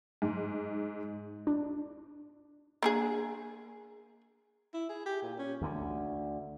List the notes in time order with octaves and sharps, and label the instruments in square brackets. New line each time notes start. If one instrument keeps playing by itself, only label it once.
[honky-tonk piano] G#2
[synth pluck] D4
[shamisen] A#3 D4 G#4
[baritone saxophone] E4
G#4
G4
A#2
C#4
[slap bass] D2 D3